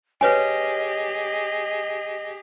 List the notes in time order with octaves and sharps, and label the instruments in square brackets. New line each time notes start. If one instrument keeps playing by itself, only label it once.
[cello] G4 G#4 [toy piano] B4 C#5 G#5 [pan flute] D#5